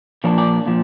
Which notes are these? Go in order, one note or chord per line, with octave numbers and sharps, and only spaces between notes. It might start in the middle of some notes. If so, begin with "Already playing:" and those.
A#2 F3 A#3 D4 C#5
D5
A#2 F3